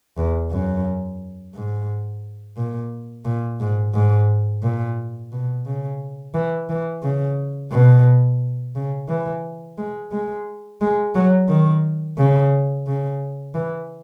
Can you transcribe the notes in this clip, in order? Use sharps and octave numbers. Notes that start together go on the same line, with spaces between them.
E2
F#2
G#2
A#2
A#2
G#2
G#2
A#2
B2
C#3
E3
E3
C#3
B2
C#3
E3
G#3
G#3
G#3
F#3
D#3
C#3
C#3
E3